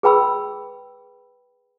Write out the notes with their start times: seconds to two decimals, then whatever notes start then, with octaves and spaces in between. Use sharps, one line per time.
0.03 G#4 B4 G5 B5 E6